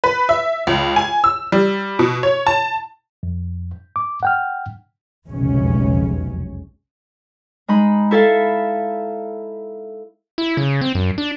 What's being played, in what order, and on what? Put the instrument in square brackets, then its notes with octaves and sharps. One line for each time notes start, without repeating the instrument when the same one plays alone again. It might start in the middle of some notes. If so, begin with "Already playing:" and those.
[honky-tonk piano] B4
E5
C#2
G#5
E6
G3
B2
C#5
A5
[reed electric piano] F2
D6
F#5 G5 F6
[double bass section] F1 B1 E2 C#3 G#3 C#4
[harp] G#3 D#4 B5
E4 A4 E5 F5
[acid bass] E4
C#3
C4
F#2
D4